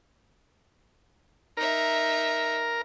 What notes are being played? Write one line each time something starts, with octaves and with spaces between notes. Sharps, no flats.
D#4 A#4 E5